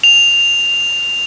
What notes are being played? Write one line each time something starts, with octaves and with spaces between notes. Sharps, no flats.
F7